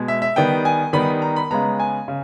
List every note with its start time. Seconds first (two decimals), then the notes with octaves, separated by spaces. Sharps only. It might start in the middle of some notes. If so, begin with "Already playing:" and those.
Already playing: B2 G#3
0.08 E5
0.22 E5
0.36 D#3 G3 B3 G5
0.65 G#5
0.93 D#3 G3 B3 B5
1.22 A#5
1.36 B5
1.51 C#3 G#3 B3 A#5
1.80 G#5
2.08 C#3